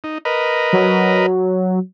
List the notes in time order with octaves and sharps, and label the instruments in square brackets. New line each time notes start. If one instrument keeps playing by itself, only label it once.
[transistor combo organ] D#4
A#4 B4 D#5
[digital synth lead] F#3